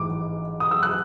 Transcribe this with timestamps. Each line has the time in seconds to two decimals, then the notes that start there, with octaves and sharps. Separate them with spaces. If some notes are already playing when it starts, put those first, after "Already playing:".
Already playing: A1 G#2 E3 D6
0.60 D#6
0.71 E6
0.83 F#6